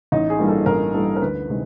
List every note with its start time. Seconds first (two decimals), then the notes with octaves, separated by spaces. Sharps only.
0.12 A1 D#4
0.30 G#4
0.39 G2 E3 G3 A#3
0.48 A4
0.66 A1 A#4
0.94 G2 E3 G3 A#3 A4
1.16 A#4
1.22 D2 B4
1.49 C3 D#3 G#3